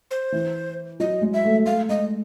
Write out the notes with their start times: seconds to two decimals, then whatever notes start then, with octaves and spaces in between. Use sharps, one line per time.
0.11 C5
0.32 E3
1.00 F#3 D#5
1.22 G#3
1.33 E5
1.45 A3
1.66 A3 F5
1.89 G#3 D#5